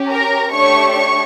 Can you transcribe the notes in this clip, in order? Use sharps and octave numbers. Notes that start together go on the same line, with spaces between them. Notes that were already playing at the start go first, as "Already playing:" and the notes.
Already playing: C#4 G4
A#4 A#5
A3 D4 G4 C#5 C#6
C#5 C#6